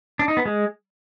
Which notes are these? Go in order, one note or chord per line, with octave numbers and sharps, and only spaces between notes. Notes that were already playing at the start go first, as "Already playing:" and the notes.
D4
D#4
B3
G#3